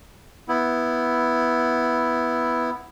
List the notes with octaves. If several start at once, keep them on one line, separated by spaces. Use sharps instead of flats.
B3 E4